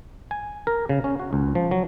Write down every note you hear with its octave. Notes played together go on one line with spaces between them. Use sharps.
G#5
A#4
C#3
C#4
F#4
C#2
F3
F#3